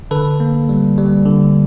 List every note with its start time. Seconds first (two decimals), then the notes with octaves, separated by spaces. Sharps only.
0.11 D3 A4 B4
0.40 A#3
0.69 G3
0.98 G3
1.26 D3